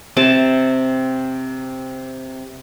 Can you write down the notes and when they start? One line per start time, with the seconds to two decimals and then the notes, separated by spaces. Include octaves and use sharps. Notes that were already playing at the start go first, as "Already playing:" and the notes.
0.17 C3 A5